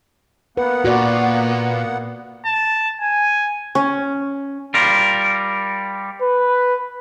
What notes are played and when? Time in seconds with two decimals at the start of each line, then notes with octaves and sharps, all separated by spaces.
0.57 A#3 B3 B4 F#5
0.85 A#2 F#4 D5
2.45 A5
3.00 G#5
3.75 C#4
4.74 G3 F4 A#4
6.22 B4